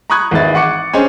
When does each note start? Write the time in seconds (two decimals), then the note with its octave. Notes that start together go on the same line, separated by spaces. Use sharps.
0.10 A#5 B5 C#6 D#6 F#6 G#6
0.31 G#1 E3 G#3 D#4 E4 A6
0.55 F#5 C#6 D6 C#7
0.93 C#4 D4 G#4 C5 D#5 G#5